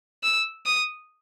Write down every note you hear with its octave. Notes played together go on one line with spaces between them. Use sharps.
E6
D#6